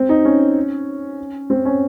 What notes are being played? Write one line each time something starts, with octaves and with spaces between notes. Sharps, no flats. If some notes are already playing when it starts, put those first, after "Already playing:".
Already playing: C4
D#4
C#4
C4
C#4